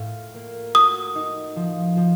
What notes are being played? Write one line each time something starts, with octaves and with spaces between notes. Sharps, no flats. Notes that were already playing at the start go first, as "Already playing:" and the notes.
Already playing: A2 F4
A#3
F#4 D#6
D#4
F3
F3